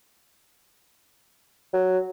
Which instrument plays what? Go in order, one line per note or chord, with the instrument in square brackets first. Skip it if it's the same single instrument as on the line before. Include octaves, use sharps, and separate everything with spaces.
[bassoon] F#3